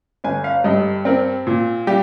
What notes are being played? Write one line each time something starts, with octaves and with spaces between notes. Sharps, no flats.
G1 G#5
F5
G2 D#5
C4 A#4
A#2
G3 G4